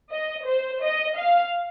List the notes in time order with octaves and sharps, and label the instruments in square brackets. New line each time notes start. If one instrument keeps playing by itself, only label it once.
[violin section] D#5
C5
D#5
F5